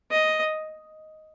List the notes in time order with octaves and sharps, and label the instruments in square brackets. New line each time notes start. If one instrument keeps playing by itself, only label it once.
[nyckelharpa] D#5